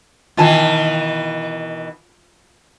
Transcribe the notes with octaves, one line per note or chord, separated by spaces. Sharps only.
B2 D#3 E3 F4 G#5 A5